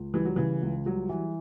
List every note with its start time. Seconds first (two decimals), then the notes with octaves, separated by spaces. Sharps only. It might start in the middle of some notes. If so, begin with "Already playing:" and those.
Already playing: C#2
0.14 E3 G3
0.25 F#3
0.36 C#3 E3
0.62 C#2
0.85 F#3 G3
1.09 E3